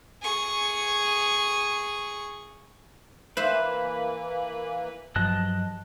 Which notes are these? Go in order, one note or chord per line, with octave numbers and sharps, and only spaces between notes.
G#4 C#6
E3 A#3 B4 C5 E5
G2 F3 F#3 D#5 A5 F#6